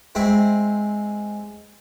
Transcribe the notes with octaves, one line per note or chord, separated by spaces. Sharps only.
G#3 C4 E4